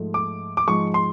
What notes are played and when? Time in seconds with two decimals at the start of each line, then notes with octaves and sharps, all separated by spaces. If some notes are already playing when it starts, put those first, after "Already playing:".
Already playing: G#2 F3 A3
0.14 D6
0.57 D6
0.67 G#2 F3 G#3 C#6
0.94 C6